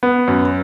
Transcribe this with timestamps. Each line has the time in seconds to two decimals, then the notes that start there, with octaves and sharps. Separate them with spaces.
0.03 B3
0.28 F#2